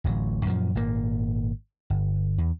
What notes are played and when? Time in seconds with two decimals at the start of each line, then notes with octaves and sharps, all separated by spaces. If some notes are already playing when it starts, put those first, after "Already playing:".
0.04 D1 A1 F#3
0.45 F#2 A#2 C#3 F3
0.75 G#1 A#2 C#3 A#3
1.90 G1
2.38 E2